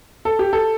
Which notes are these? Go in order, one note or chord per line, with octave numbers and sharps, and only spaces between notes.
A4
G4
A4